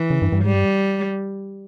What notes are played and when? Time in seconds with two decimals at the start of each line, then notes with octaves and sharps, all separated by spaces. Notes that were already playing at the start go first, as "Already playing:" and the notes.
Already playing: E3
0.10 C#3
0.22 G2
0.32 G2
0.44 G#2 G3
0.54 G2